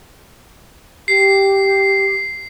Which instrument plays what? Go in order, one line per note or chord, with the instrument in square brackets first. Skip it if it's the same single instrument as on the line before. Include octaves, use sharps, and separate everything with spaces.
[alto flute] G4 [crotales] C7